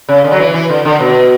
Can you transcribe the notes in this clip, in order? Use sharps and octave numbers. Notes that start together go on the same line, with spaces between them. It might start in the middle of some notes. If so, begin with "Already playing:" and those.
C#3
D3
F#3
E3
E3
D3
D3
B2